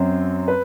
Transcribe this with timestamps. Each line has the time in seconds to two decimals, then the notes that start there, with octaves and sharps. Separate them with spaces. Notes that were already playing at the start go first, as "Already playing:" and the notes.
Already playing: F#2 F#3 C4
0.48 B4